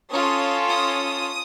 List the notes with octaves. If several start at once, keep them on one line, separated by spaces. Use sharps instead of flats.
C#4 F4 A4 D#6
D#6